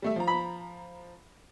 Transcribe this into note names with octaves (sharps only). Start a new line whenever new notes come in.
G3 A3 E5
F3 A#5
B5